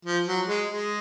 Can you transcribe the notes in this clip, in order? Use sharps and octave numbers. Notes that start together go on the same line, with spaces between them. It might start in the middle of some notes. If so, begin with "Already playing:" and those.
F3
F#3
G#3
G#3